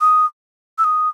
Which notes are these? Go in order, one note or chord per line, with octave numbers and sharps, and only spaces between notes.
D#6
E6
D#6